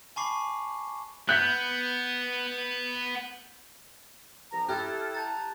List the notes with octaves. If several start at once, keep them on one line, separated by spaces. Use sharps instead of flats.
G#5 A5 B5 C#6 D6 C7
B3 F#6 G6 B6
C2 F3 A#5
E4 G4 A4 F6 F#6 G#6
A5 A#5 G6 A6